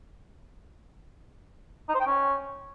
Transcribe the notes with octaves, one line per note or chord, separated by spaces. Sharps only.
D#4
C5
G5
C#4